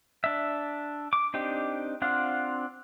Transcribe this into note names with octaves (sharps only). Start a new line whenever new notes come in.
D4 E5
D6
C4 D4 D#4 G4
C4 D4 F4 F5 F#5